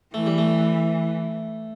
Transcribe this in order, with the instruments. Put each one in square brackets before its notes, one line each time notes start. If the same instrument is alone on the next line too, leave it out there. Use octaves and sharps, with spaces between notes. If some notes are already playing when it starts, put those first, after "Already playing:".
[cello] E3 [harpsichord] A3
[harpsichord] G3
A3